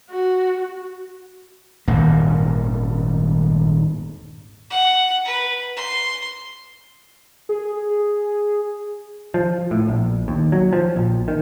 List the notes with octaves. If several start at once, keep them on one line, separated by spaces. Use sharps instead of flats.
F#4
D#1 G#1 G2 A#3
F#5
B4
C6
G#4
F3
A2
A#1
D#2
F#3
F3
A#1
D#3